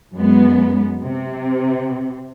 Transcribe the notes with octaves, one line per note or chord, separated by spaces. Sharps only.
F#2 G#3 B3
C3